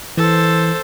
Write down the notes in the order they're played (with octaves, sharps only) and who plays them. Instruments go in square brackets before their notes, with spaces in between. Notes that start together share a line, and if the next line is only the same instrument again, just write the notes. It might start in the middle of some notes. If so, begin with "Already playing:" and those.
[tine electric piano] E3 [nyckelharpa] A4 C5